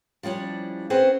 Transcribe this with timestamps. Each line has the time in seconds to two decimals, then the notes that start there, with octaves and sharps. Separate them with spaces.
0.23 F3 G3 C#4 D4 E4
0.90 C4 C#4 G#4 B4 C5